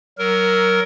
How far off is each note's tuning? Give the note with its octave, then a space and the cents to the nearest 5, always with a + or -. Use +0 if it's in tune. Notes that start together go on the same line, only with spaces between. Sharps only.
F#3 +25 A#4 +0